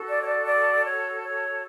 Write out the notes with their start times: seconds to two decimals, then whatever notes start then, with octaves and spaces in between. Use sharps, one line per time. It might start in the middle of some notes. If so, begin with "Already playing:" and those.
Already playing: F#4 A4
0.08 D5
0.22 C#5
0.26 D5
0.46 D5
0.84 C#5
1.23 C#5